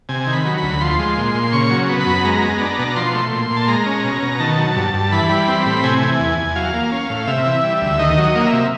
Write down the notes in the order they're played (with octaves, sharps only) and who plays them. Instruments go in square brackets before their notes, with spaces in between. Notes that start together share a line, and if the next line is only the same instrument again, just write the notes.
[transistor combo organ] C3 G#5
D#3
B5
F#3
B5
D2
F3 C6
G#3
A#2
A#2
C#3 C#6
F#3
B3
B5
F#2
G#3 A#5
B3
D4
B2
F3 C6
A3
A#2
A#2
A5
G#3 A#5
C#4
B2
B2
D#3 A5
F#3
G2
G2
E3 B5
G3
C4
A2
C3 G#5
E3
E2
E2
F#3 F5
A#3
C#4
A2
C3 E5
E3
G3
D2
D#3 D#5
F#3
D#5
A#3
E5
C3